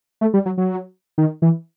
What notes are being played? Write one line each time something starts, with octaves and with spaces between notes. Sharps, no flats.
A3
G3
F#3
F#3
D#3
E3